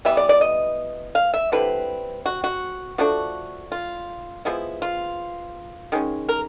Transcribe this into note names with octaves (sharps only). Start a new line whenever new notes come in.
E3 G3 B3 E5
D5
D5
D#5
F5
E5
D3 G3 C4 E4 B4
F#4
F#4
F3 A3 D4 F#4
F4
F3 G#3 B3 E4
F4
D#3 G#3 C#4
A#4